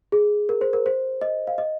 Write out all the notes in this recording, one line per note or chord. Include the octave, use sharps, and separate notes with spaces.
G#4
A#4
C5
A#4
C5
D#5
F5
D#5